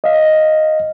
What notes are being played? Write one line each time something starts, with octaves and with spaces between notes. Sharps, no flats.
D#5 F5